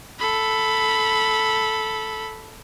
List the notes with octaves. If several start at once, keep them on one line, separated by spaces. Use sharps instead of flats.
A4 B5